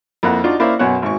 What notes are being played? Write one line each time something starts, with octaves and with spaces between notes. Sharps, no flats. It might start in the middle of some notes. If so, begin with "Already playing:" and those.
F2 A#3 E4 F4 F#5
D4 D#4 F4 F#4 D5 D#5
A#3 C#4 E4 C5 D5 F5
B1 F#2 B3 C#5 F#5
G#1 G#2 C#6